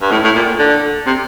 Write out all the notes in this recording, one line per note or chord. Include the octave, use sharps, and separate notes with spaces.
G2
A2
A2
A#2
D3
C3